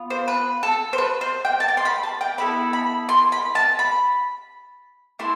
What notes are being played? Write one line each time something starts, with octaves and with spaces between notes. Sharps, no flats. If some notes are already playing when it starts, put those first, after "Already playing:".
Already playing: B3 F4
C5
B4
A4
C5
B4
C5
G5
A5
G5
C6
B5
A5
G5
B3 E4 A4 B5
B5
C6
B5
A5
B5
A3 E4 C6